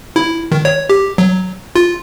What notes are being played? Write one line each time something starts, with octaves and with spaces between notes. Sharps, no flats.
E4
D#3
C#5
G4
F#3
F4